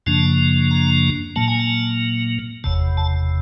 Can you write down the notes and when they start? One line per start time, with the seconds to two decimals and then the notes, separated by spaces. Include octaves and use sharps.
0.06 F#2 C#3 F3 A#3 D4 A5
0.71 A#5
1.36 A#2 F#3 A#3 A5
1.48 G#5
1.59 A5
2.64 F#1 E2 C3 A5
2.97 A5